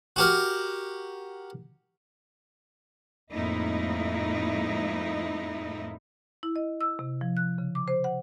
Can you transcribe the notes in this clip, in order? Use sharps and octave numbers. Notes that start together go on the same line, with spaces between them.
F#4 G4 A#4
F2 A2 G#3 A#3 D#4 E4
E4
D#5
E6
C3
F3
F#6
C#3
D6
C5
F#5